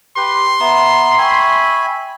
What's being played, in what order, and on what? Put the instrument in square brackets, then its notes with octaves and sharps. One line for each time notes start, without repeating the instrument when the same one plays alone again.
[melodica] G4 B4 [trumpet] C6
[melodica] B3 [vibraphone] E5 A#5
[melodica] E5 G#5 B5 [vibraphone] G5 C#6